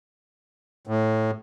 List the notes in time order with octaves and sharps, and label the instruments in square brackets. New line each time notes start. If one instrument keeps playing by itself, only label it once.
[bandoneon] A2